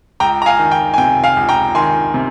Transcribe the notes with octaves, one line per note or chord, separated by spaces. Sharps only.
C#2 G5 A#5
A#5
F5 G#5
D#3
G5
G#5
C3 G5
F5 G#5
C#2
G5 A#5
D#3 G#5 C6
C3